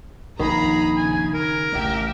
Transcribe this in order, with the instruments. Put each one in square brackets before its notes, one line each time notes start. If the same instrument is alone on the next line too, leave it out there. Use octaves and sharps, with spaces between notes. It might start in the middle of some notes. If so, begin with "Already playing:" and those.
[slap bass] A#1 F2 [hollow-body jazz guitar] D#3 D#4 [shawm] G#4 [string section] A#5 B5
[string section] C#3 [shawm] G#5
[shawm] A#4
[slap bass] A1 C#3 [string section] G4 E5